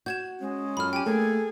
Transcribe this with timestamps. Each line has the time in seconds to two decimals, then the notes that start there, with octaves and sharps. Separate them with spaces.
0.06 F#4 G6 G#6 E7
0.41 G#3 C#4
0.77 F#2 F4 A4 B5 F6
0.93 G4 G5 G#5
1.06 A3 A#3 G#4 A4